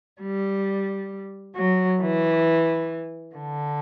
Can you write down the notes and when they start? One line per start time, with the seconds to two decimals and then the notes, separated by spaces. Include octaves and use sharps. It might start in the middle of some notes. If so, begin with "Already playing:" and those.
0.21 G3
1.55 F#3
2.01 E3
3.34 D3